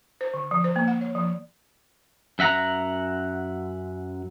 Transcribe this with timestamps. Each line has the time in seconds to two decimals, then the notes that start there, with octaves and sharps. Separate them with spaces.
0.21 C5
0.34 D3
0.51 F3
0.64 C5
0.76 A#3
0.88 F#5
1.01 C#5
1.15 F3
2.39 F#2 E5 F#5 A#5